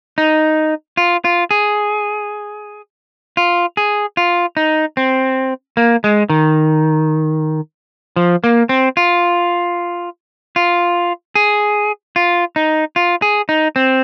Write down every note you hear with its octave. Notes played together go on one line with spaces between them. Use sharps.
D#4
F4
F4
G#4
F4
G#4
F4
D#4
C4
A#3
G#3
D#3
F3
A#3
C4
F4
F4
G#4
F4
D#4
F4
G#4
D#4
C4